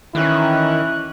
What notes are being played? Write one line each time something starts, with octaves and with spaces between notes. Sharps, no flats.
D#3 E3 C#4 E4 F#6